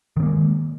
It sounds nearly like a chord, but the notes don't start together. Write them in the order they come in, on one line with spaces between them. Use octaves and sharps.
D#3 C4 A#3 G#3